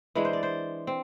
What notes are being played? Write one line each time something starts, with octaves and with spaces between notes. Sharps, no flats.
E3 G#3 D4 B4
C5
D5
C5
C4